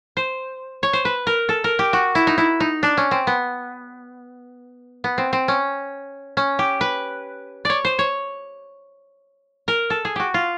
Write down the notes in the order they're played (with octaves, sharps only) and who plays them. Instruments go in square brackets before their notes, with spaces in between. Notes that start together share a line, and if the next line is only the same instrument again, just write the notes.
[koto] C5
C#5
C5
B4
A#4
A4
A#4
G4
F#4
E4
D#4
E4
D#4
D4
C#4
C4
B3
B3
C4
C4
C#4
C#4
G4
B4
C#5 D5
C5
C#5
A#4
A4
G#4
F#4 G4
F4